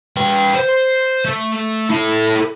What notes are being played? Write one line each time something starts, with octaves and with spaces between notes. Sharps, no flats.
B4 G5
C5
A3
E4 A4